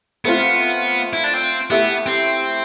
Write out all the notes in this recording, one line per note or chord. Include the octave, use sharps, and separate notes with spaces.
A3 B3 C4 F4
E4
D4
C4
A3 B3 E4 G4
C4